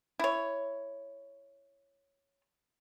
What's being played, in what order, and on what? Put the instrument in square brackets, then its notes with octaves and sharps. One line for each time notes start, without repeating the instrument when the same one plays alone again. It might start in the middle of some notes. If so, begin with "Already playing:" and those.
[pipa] E4 C#5